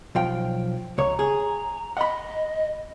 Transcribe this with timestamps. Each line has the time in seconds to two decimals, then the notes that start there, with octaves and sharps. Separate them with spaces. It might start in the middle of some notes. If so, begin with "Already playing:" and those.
0.15 B1 F3 G5
0.98 C#2 C#5 A#5
1.19 G#4
1.97 D#5 F#5 B5